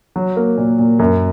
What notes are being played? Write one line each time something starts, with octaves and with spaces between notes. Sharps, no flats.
F#3
A#3
A#2
A#2
F#2